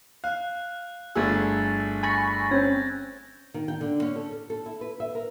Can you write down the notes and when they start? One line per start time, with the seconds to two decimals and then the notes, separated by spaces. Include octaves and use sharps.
0.24 F5 F#6
1.15 G1 A3 G#4 E6 G#6 A6
2.03 G#5 B5 C#6 A6 A#6
2.51 C4 C#4 G6 G#6
3.54 D#3
3.68 G5
3.81 D3
4.02 C#4
4.16 A4
4.31 A4
4.50 A4
4.66 E4
4.81 B4
5.00 E5
5.15 A#4